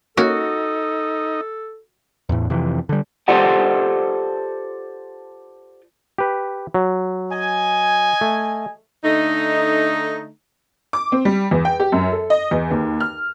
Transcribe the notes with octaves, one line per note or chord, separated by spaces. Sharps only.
A#3 C#4 D#4 F#4 A4
E2 A2
F2 C3 E3
D3 G3
F4 G4 A4 C5 D5 F#5
G4 B4
F#3
D#5 G#5
A3
D3 A3 D#4
D6
C4
G3
E2
G5
G4
F#2
A4
D#5
E2
D#2
F6